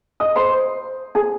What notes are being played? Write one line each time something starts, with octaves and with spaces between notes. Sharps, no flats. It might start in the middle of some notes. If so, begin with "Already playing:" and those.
D#5 D#6
C5 C6
G#4 G#5